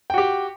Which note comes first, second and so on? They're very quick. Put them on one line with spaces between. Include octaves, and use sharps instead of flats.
G5 F#4 G4